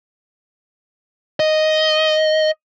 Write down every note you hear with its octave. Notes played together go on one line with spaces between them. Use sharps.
D#5